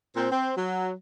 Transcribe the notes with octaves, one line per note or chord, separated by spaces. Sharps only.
A#2 C4
C4
F#3